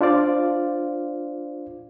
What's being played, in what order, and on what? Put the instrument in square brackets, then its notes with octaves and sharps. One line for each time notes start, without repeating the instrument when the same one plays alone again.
[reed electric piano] D4 F4 C5 D5 F5